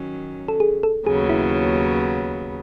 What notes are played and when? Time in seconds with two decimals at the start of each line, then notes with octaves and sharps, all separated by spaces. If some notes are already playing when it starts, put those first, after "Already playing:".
Already playing: D#3 F#3 C#4
0.48 A4
0.60 G#4
0.83 A4
1.06 D#2 C#3 F#3 B3 G#4
1.30 E4